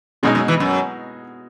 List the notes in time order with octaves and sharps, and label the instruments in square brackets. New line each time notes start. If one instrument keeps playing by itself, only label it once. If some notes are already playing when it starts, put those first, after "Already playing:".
[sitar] F#2 [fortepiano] B2 G#3 D#4
[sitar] F#2
E3
F#2